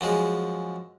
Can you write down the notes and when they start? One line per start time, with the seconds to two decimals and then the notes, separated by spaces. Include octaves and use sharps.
0.01 F#2 F3 G#3